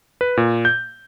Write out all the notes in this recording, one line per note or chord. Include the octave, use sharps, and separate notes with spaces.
B4
A#2
G6